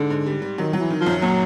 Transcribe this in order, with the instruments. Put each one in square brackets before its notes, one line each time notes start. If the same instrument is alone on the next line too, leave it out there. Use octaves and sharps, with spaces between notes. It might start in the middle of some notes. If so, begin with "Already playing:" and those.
Already playing: [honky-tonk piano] G#2 [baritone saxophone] D3
[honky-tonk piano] G#2
G3
G3
[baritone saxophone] D#3 [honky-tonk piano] F#3
[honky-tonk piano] F#3
[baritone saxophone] E3
[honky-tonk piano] D#3
[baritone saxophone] F3
[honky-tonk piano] F#2
[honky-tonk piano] A#2 [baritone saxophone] F#3